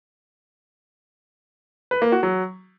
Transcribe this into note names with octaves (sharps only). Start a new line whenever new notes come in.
B4
A#3
F#4
F#3